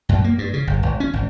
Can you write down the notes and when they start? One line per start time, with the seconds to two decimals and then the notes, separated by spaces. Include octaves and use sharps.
0.09 F#2
0.24 A#3
0.38 G2
0.53 C#3
0.67 G1
0.83 G#1
1.00 C#4
1.13 G#1